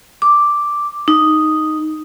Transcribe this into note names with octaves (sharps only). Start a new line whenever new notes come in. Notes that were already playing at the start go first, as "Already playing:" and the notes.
D6
D#4